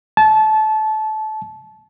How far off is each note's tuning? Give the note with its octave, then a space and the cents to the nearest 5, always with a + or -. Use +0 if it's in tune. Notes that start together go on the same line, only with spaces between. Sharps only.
A5 -25